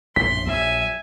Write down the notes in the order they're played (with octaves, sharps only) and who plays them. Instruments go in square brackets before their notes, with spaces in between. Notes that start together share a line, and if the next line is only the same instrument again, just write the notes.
[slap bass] A#1 F#2 A2 [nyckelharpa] C6 [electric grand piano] B6
[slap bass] A#1 F#3 [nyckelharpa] E5 G#5